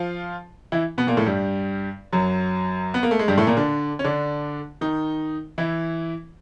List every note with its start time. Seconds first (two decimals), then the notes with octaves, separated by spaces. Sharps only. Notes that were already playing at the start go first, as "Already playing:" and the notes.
Already playing: F3 F4
0.72 E3 E4
0.98 B2 B3
1.07 A#2 A#3
1.17 A2 A3
1.27 G2 G3
2.13 F#2 F#3
2.94 B3
3.03 A#3
3.11 A3
3.19 G#3
3.28 G2 G3
3.37 A2 A3
3.47 A#2 A#3
3.57 D3 D4
3.99 C#4
4.04 D3 D4
4.81 D#3 D#4
5.58 E3 E4